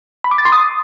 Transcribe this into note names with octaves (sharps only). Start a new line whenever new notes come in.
B5
D6
A6
C6
D#6